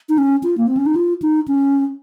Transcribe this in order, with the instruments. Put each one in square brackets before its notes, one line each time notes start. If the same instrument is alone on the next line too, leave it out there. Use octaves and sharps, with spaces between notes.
[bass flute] D#4
C#4
F4
A#3
C4
C#4
D#4
F4
D#4
C#4